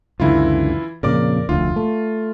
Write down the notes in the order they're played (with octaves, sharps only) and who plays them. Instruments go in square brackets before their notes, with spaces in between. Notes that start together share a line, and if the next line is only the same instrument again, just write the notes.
[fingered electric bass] C#2 F#2 D3 [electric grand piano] E3 E4 F4
[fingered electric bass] F2 A#2 C#3 [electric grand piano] A#4 D5 D6
[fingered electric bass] F1 D2 [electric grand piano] F4
[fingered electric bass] A3